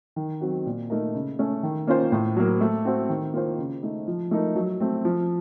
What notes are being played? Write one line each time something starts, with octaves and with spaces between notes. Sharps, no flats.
D#3
F#3 C4 F#4
A#2
A3 D#4 A#4
C#3
A3 C#4
D#3
A#3 C#4 F4 C5
A2
F#3 A#3
A3
C4 F#4 C5
D#3
A#3 F4 C5
C#3
A3 D#4
F3
A3 D#4 A#4
F#3
A3 C4
F3